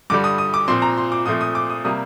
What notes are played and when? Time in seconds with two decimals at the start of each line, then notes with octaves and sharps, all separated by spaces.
0.10 G2 D3 G3 D6
0.24 D#6
0.38 D#6
0.54 D6
0.68 A#2 F3 C4 C6
0.82 A#5
0.97 C6
1.12 D6
1.26 A#2 F3 A3 C4 D#6
1.41 D#6
1.55 D6
1.70 D#6
1.85 C3 G3 A#3 D#6